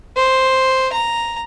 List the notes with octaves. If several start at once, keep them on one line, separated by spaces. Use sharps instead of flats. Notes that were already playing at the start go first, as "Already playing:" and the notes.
C5
A#5